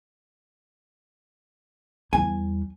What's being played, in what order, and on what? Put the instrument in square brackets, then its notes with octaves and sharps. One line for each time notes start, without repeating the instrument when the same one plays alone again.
[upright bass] E2 G3 [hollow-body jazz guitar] G#5